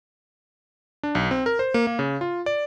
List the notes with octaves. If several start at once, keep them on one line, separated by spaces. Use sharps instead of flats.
D4
B1
C4
A#4
C5
A#3
A#3
C#3
F4
D5